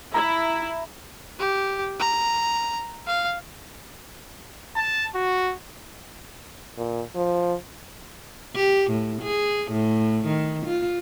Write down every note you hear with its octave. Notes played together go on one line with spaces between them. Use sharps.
E4 A#5
G4
A#5
F5
A5
F#4
A#2
F3
G4
A2
G#4
A2
D#3
F4